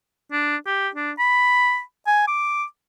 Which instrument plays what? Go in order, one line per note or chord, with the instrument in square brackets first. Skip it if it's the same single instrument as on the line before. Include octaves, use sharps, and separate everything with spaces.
[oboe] D4
G4
D4
B5
G#5
D6